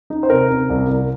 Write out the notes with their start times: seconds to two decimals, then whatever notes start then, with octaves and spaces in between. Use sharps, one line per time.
0.10 D#4
0.23 C5
0.29 C3 A#4
0.50 C3
0.70 C2
0.90 C2